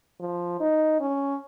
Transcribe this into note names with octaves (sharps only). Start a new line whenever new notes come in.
F3
D#4
C#4